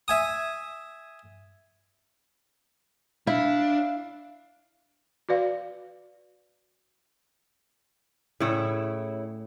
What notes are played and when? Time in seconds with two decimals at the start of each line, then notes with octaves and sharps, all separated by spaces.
0.08 E5 G#5 D#6
3.27 D4 E4 F5
5.29 F#4 B4 D5 F5
8.40 A2 C#3 E4 C#5